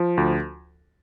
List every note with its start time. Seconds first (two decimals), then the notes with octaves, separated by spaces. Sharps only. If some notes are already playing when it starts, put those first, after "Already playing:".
Already playing: F3
0.17 D2